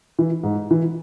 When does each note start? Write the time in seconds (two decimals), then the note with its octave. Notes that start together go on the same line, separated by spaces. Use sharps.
0.19 E3
0.43 G#2
0.71 E3